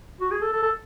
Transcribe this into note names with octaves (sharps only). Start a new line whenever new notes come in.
F#4
G#4
A4
A4
A4